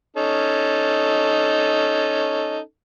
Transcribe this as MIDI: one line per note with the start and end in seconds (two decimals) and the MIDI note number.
0.17 2.59 61
0.17 2.59 63
0.17 2.59 69